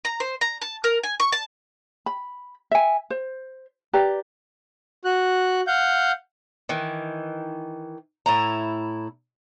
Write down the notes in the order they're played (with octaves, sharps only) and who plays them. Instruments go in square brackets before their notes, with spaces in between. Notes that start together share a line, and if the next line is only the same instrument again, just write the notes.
[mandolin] A#5
C5
A#5
A5
A#4
G#5
C#6
A5
[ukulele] B5
E5 G#5
C5
G4 B4 D5 A#5
[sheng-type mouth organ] F#4 F#6
F5 F#5 G6
[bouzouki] D#3 E3
A2 E4 A#5